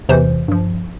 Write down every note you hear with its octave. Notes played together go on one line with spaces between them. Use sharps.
E2 C3 E3 C5
G2 F3